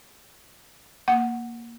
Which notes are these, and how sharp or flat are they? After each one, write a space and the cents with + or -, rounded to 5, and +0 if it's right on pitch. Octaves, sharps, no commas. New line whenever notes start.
A#3 +0 F#5 +0